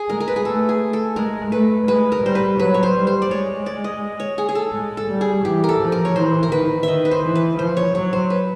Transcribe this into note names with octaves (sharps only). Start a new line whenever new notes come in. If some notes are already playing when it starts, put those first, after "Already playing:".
Already playing: G#4
G#3 A#4
A#4
B4
G#4
A3 A4
G#4
A4
G#3 A#4
A3 B4
G#3 B4
A#4
G3 C5
B4
F#3 B4
C#5
C5
G3
C5
D5
G#3 C#5
D5
D#5
C#5
G#4
G#4
A4
G#3
A4
G3
G#4
E3 G4
A#4
A4
F3
A#4
C#5
E3 C5
A#4
D#3 B4
D#3 D#5 E5
B4
C5
E3
B4
F3 C5
C#5
F#3 C#5
C5
B4